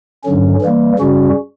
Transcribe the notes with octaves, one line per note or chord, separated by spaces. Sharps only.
G2 D3 F#3 C#4
E3 G3 A#3
F#2 C#3 G3 C#4 F#4